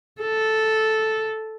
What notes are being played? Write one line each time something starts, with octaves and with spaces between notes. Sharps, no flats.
A4